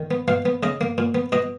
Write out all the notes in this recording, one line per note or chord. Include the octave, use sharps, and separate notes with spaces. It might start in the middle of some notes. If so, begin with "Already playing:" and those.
Already playing: D#3
B3
B2 F5
B3
C#3 D#5
A#3
A#2
B3
B2 D#5